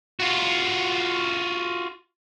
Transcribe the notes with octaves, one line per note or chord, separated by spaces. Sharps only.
F4 F#4